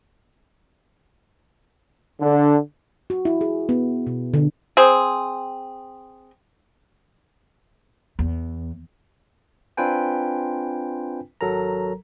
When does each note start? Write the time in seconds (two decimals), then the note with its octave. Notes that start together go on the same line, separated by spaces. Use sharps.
2.21 D3
3.10 F#4
3.25 E4
3.41 G#4
3.69 B3
4.07 B2
4.34 D3
4.77 C4 G#4
8.19 E2
9.77 C4 D4 F4 B4 G5 G#5
11.41 G#1 F#3 A4 A#4 A#5